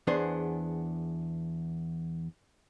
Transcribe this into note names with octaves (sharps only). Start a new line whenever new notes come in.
E2 B3 D4 G#4 C5